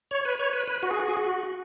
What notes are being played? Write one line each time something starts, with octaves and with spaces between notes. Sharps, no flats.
C#5
B4
C#5
B4
B4
F#4
G#4
F#4
G#4
F#4